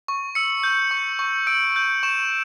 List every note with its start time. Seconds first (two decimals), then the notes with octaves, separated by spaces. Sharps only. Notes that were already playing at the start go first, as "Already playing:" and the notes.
0.08 C#6
0.35 E6 C#7
0.63 G6
0.91 C#6
1.19 C#6
1.47 E6 D7
1.76 G6
2.03 C#6 E7